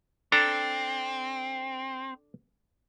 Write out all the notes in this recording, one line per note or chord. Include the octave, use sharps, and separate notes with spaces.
C4 D4 A4 A#5